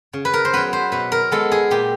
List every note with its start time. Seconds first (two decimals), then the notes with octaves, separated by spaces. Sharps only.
0.13 C#3
0.25 B4
0.34 A#4
0.45 C5
0.53 F#3 B3 B4
0.73 C5
0.92 B2 B4
1.12 A#4
1.32 G#3 B3 A4
1.52 G#4
1.71 A#2 G4